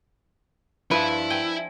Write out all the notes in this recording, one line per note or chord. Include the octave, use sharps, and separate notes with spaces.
G2 F3 E4 B4
G5 G#5